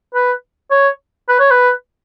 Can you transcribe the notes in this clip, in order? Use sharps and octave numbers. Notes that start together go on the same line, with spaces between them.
B4
C#5
B4
C#5
B4